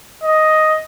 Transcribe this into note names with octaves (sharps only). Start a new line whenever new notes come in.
D#5